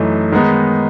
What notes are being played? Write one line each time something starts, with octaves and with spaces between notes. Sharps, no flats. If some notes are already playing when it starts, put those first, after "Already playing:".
Already playing: F#2 E3 A3 D#4
D#3 G#3 B3 D#4